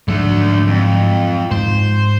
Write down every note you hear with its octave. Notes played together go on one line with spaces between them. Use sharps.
G#2 D3 F3 F#3 A3
F2
G#2 C5